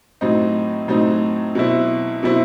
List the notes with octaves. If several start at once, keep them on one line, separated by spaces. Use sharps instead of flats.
A2 F#3 C4 D#4
A2 F#3 C4 D#4
B2 F#3 C4 E4
B2 F#3 C4 E4